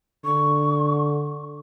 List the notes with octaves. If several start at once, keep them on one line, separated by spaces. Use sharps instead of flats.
D3 C#6